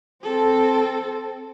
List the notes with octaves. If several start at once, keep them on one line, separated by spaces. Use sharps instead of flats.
C4 A4